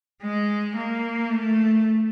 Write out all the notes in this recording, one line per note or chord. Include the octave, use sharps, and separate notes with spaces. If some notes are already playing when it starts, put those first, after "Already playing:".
G#3
A#3
A3